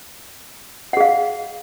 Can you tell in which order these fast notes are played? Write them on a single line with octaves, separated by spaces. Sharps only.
F#5 G#4 F5